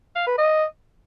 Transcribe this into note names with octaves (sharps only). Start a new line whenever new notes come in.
F5
B4
D#5